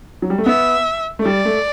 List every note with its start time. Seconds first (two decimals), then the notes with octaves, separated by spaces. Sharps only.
0.22 F#3
0.30 G3
0.38 A3
0.46 B3 E5
1.19 A3
1.25 G3 D5
1.45 A3